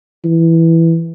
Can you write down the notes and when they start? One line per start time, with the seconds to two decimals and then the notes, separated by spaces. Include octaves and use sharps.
0.25 E3